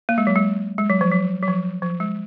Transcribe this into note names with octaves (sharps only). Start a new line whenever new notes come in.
A#3
G#3
F#3
G#3
G#3
F#3
F3
F#3
F#3
F3
F3
G#3